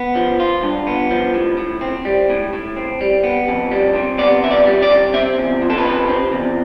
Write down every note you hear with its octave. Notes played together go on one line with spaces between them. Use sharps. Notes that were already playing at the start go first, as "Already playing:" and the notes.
Already playing: B3
F3
F4
G2
B3
F3
A2
A2
C4
G3
A2
A2
C4
G3
B3
F2
G3
C3
B3 D5
F2 E5
D5
G3
D5
C3
C4 E5
E2
F3
A4
B4
C3
C4
E2